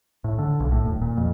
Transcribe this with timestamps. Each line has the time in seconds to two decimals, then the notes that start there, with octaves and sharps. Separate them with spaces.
0.24 A2
0.39 D3
0.60 B1
0.72 A2
0.85 D#1
1.02 A#2
1.17 F2